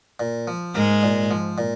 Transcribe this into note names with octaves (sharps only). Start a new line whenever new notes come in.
A#2
F3
G#2 G#3 A#3
A#2
F3
A#2